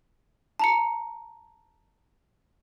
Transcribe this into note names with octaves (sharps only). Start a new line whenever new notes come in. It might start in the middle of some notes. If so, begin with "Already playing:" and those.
A5 A#5 C#7